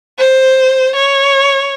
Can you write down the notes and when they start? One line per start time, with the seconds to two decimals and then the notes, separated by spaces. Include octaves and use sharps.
0.19 C5
0.96 C#5